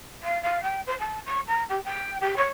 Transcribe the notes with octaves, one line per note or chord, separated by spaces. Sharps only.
F5
F5
G5
C5
A5
C#6
A#5
G4
G5
G4
C#5